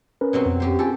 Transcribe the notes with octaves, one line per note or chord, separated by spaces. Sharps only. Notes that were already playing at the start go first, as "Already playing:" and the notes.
C#4 A#4 B4
B2 F#3 C4
F2
F#2 G4 C5
F4 G4 A4 G#5